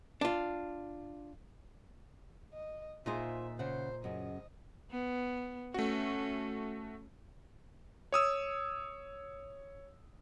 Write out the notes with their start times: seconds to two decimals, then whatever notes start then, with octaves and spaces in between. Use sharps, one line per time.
0.21 D4 F4
2.53 D#5
3.06 A#2 D#4 F4 G#4 C5 E5
3.59 C#3 C5 F#5
4.04 F#2 C#3 D#5
4.91 B3
5.74 A3 C#4 F#4
8.12 C#5 D#6 E6